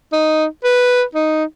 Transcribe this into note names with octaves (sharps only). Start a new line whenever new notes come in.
D#4
B4
D#4